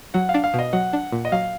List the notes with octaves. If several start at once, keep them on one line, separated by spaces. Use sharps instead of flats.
F#3 F#5
F5
D4
F5
B2 D#5
F#3 F#5
D4
A#2
D#5
F#3 F5